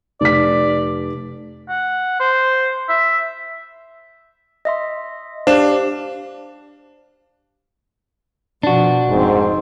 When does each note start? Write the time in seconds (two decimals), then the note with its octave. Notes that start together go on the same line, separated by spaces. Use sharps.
0.21 F1 D5 B6
1.69 F#5
2.20 C5
2.89 E5
4.65 D#5 E5 C6
5.47 D4 G4 C5 F5 E7
8.63 B2 F3 D4 F#4
9.10 F1 G#2 C4